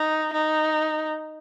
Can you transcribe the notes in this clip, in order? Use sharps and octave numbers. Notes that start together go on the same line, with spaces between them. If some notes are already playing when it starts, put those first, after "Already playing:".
Already playing: D#4
D#4